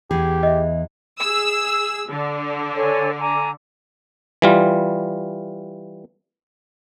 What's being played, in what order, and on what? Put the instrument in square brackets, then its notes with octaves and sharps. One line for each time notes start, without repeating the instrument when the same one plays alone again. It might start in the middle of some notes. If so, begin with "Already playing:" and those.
[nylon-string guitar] E2 E3 G#4 [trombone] G4
[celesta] D#5 E5
[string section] G#4 E6
D3
[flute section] A4 C#5 G#5
G#5 A#5 D6
[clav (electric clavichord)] E3 G3 F4